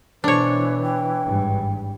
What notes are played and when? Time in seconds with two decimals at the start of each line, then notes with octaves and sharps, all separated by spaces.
0.24 B2 E3 D4 C5 C#5
0.82 G5
1.23 G#1 G2